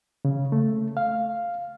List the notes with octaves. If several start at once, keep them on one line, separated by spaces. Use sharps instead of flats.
C#3
A3
F5